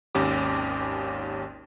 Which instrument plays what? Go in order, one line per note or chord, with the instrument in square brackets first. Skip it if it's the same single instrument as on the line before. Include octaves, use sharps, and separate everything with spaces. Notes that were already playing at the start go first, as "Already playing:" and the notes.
[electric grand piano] G#1 D#2 C#4 G4 D6